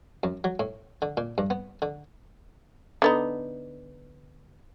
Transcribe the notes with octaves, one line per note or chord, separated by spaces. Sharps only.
F#2
F#3
A2
D3
A#2
G2
B3
D3
D3 B3 D#4